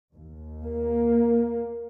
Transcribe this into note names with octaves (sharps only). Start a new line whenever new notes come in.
D#2
A#3